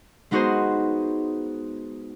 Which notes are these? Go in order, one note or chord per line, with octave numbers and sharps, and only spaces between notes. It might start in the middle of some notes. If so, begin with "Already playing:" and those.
G#3 B3 D#4 F#4 G#4 C5